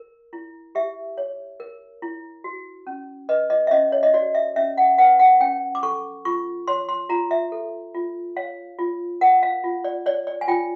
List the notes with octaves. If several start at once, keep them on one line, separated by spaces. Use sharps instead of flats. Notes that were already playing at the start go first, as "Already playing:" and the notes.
Already playing: A#4
E4
G4 E5
C#5
A#4
E4
F#4
C#4
B4 D#5
D#5
E5
C#4 D#5
C#5
D#5
F#4 D5
E5
C#4 E5
F#5
B4 F#5
F#5
C#4 G5
D6
A4 C#6
F4 C#6
C#5 C6
C6
F4 A#5
E5
A4
F4
C#5 F5
F4
A#4 F#5
F5
F4
D5
C#5 D5
D5
G#5
F4 G5